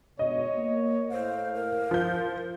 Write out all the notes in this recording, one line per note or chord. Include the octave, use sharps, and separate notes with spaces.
D2 G#2 B2 C#5 D#5
A#3
A2 C5 F5
A#4
F3 G6